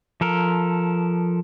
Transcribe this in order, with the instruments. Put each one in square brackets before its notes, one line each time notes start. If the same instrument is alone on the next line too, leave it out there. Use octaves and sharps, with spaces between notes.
[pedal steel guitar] F3 A4 A#4